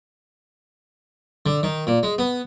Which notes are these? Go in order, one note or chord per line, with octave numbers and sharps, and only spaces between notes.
D3
D#3
A#2
G#3
B3